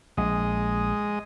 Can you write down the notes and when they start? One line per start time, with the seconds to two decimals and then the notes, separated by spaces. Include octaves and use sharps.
0.17 A#1 G#3 D#5